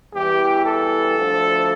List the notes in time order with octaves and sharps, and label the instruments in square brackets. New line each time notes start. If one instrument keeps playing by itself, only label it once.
[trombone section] E2 E3 G3 G4
A4
D2 D3 F3